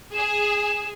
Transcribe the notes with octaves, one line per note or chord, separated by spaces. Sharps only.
G#4 E7